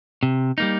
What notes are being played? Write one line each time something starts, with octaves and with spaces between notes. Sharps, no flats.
C3
G3 A#3 D#4